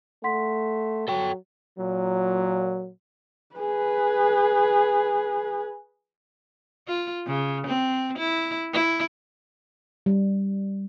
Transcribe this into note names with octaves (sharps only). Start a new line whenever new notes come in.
A3 F#5 C6 B6
F#3 A4 G5
A#2 F#3
G#4 B4
F4
C#3
C4
E4
E4
G3